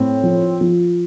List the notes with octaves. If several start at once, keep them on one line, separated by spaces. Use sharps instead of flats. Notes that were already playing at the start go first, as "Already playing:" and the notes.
Already playing: A2 C4
F3
F3